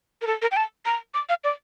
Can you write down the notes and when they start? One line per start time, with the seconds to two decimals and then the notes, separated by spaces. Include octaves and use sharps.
0.21 A#4
0.27 A4
0.42 A#4
0.51 G5
0.56 A5
0.86 A#5
1.14 D6
1.29 F5
1.44 D5